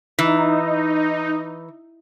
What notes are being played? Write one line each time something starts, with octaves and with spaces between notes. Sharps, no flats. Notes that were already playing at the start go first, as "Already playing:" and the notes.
E3 D#4